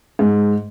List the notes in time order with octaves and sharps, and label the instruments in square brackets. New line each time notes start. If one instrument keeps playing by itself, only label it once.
[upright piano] G#2